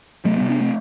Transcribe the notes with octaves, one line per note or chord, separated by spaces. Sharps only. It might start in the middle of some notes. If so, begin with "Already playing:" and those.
C3 F#3 A3
G3 B3
C3
B3 D4
A3 C4